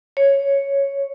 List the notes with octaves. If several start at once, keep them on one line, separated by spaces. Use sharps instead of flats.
C#5